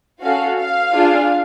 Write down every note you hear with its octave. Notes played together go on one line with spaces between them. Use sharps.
C#4 F#4 A4 F5
F5
D4 F4 G#4